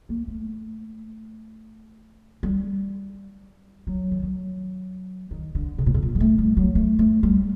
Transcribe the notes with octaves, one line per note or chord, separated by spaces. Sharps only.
A#3
A3
G3
F#3
D#3
F#3
D#3
D3
C3
A#2
C3
A#2
G3
A3
G3
F#3
A3
A3
G3